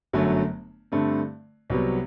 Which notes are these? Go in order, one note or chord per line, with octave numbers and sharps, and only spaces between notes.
G1 F#2 D3 F#3 A3
G2 D3 A3 C4
C2 C3 F#3 B3